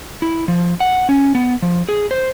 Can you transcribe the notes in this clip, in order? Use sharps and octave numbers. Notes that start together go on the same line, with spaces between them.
E4
F3
F#5
C#4
B3
F3
G#4
C5